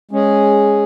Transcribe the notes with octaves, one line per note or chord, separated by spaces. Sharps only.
G#3 C#4 G#4